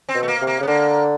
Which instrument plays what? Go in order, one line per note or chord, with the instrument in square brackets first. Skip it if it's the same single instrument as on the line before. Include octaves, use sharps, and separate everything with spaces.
[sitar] C4
[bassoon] B2
[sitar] A3
A#3
[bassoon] C3
[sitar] A#3
[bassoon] C#3 [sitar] B3
[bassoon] D3 [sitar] A#3